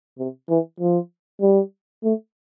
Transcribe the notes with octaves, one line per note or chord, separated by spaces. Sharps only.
C3
E3
F3
G3
A3